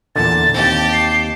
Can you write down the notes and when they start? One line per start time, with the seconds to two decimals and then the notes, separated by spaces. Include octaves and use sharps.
0.16 E2 A#2 D3 A5 A6
0.54 D#2 C4 G4 A5
0.93 C7